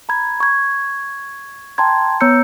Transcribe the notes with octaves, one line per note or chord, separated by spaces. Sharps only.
A#5 B5 G#6
C#6 G#6
G5 A5 A#5 C6 G#6
B3 C#5 A#5 E6 G6 C#7